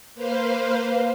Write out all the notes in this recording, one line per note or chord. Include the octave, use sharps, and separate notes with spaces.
A#3 B4 C5 F5